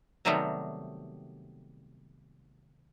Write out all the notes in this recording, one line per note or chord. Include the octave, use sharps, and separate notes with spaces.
C3 D#3 F#3 G3 A3 B3